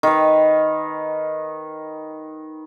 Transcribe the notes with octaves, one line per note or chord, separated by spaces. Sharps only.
D#3 B4